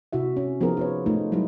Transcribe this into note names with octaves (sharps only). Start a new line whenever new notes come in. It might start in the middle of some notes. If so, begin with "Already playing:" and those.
C3 E4 F#4 E5
C#4
F3 B3 D#4 G#4 A#4
F4 B4 C#5
A3 D#4 F4
F#3 G3 D#4 E4